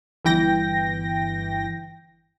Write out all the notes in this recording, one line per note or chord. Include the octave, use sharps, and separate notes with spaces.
G1 E3 G5 A#6